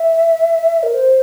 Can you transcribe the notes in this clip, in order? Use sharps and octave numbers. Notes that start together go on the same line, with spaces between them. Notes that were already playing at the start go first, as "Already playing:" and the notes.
Already playing: E5
A#4
C5